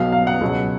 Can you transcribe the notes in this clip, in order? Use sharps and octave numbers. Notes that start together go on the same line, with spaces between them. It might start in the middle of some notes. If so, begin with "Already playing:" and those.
Already playing: B1 B2 F#3 F5
F5
F#5
C#2 B2 F#3